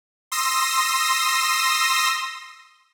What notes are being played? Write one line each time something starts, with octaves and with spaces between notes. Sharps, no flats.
C6 D#6 E6 A#6